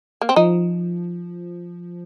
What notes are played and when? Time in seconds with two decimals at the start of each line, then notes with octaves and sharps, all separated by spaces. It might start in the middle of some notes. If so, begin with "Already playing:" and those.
0.21 A#3
0.29 C4
0.36 F3 D#4